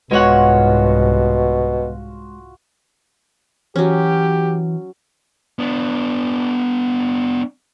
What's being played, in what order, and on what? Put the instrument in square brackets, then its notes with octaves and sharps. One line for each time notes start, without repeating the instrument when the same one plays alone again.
[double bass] C2 G#2 [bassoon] B2 [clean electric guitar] G#3 C#5 F#5 [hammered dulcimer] F4 F#4
[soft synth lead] E3 [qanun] F#3 C#4 [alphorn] G4
[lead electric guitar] B3 D4